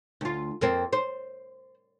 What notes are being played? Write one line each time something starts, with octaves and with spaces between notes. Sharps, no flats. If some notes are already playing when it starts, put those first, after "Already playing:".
D2 F4
F2 A#3 C4
C5